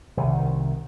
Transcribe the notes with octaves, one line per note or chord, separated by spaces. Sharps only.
C2 D#3